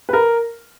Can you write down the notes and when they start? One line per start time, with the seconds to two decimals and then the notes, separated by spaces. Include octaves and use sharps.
0.09 B4
0.13 A#4